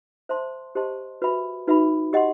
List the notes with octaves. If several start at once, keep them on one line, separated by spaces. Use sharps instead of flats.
C5 E5 A5 C6
G4 C5 D#5 A5 C6
F#4 B4 E5 B5
D#4 F#4 B4 E5 B5
G4 D#5 F#5 C6